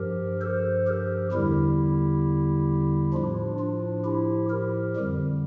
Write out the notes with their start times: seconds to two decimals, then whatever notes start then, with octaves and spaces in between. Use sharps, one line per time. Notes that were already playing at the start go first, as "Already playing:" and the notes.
Already playing: G2 F3 G4 A#4
0.42 A4 C5
0.87 G4 A#4
1.32 E2 D3 G3 E4 G4
3.14 A2 F3 D4 F4
3.59 D4 F4
4.05 E4 G4
4.50 G4 A#4
4.96 F2 D3 G3